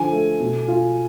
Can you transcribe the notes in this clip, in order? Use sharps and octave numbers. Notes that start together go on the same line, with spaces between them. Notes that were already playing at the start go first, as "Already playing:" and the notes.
Already playing: D3 F3 G#5
A3
B2
F4